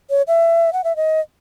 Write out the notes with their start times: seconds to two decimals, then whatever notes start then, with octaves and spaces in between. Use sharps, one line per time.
0.10 C#5
0.28 E5
0.73 F#5
0.84 E5
0.96 D#5